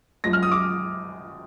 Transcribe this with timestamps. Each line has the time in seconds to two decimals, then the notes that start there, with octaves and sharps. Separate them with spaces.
0.24 F#2 F3 G#3 A#6
0.33 F6
0.43 D#6
0.52 D6